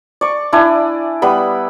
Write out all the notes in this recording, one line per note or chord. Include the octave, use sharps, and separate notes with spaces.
D5 C#6
D4 E4 D5 G#5
G3 B3 B5